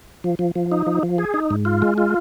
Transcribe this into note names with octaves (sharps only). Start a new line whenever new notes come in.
F3
F3
F3
D#4
F3
F3
G#4
D#4
G#2
F4
G#3
F4